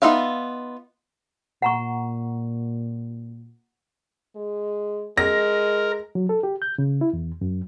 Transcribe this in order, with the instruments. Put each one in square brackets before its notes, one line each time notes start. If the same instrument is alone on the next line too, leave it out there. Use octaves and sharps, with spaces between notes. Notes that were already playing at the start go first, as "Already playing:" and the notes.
[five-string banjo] B3 D#4 F4 E5 F5
[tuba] A#2 [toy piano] F#5 A#5 C#6
[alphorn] G#3
[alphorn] G#3 [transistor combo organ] A#4 [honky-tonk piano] A#6
[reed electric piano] F#3
A4
G4
G6
C#3
E4
E2
F#2